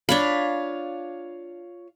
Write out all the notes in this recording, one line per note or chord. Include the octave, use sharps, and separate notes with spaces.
D4 F4 C#5 F5 B5